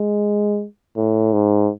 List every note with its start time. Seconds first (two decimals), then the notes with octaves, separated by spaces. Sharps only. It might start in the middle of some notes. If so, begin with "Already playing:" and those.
Already playing: G#3
0.96 A2
1.33 G#2